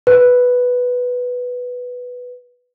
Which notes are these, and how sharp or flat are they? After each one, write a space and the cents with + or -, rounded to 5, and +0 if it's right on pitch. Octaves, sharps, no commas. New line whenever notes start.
B4 +0